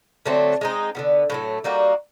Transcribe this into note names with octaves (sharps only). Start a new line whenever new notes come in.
D3 F#3 A3 C4
G#3 C4 D#4
D3 G3 B3
A2 F#3 A3
G3 A#3 D#4 F#4